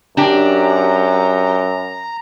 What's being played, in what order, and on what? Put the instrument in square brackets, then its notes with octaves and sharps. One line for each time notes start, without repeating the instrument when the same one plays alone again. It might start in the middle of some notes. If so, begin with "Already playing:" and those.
[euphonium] F#2 [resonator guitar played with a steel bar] D4 G4 [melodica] A#5